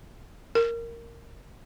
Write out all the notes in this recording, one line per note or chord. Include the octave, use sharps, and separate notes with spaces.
A#4